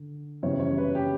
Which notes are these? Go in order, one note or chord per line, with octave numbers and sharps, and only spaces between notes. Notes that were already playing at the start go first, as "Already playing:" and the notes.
Already playing: D3
F#2 C#3 E3 G3 C#4 C#5
C#5
B4
G4